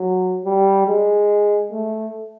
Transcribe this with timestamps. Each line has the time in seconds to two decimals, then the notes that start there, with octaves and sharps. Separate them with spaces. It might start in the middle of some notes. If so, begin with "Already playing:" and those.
Already playing: F#3
0.45 G3
0.87 G#3
1.72 A3